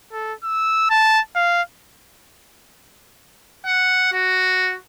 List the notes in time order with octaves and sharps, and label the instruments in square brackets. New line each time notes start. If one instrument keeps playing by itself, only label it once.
[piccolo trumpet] A4
E6
A5
F5
[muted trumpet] F#5
F#4